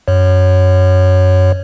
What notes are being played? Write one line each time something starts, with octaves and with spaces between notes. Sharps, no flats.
F#2 C#5